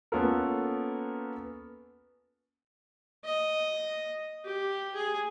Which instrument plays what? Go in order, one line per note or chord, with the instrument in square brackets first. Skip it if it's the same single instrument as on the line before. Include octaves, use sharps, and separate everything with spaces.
[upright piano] A#3 B3 C#4 F4 A4 A#4
[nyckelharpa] D#5
G4
G#4